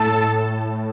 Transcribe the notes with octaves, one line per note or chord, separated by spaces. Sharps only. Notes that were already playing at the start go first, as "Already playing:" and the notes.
Already playing: A2 A4 A5